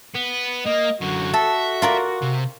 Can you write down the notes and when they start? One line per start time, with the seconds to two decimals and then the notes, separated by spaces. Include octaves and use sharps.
0.15 B3
0.66 A#3 D#5
1.01 F#2 D3 F#4
1.34 A4 E5
1.82 F4 A#4 D5
2.22 C3